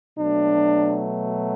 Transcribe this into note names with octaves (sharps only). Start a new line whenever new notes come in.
B2 F#3 A3 D4